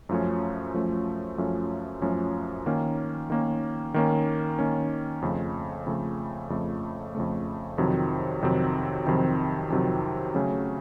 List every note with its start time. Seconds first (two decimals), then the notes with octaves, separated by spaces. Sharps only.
0.09 F#2 F3 A3 C#4
0.74 F#2 F3 A3 C#4
1.38 F#2 F3 A3 C#4
2.02 F#2 F3 A3 C#4
2.66 D#3 A#3 C#4
3.30 D#3 A#3 C#4
3.94 D#3 A#3 C#4
4.59 D#3 A#3 C#4
5.22 F2 C#3 A3
5.86 F2 C#3 A3
6.50 F2 C#3 A3
7.15 F2 C#3 A3
7.78 F2 C3 D#3 F#3 C4
8.42 F2 C3 D#3 F#3 C4
9.07 F2 C3 D#3 F#3 C4
9.70 F2 C3 D#3 F#3 C4
10.34 C#3 F#3 A3 C#4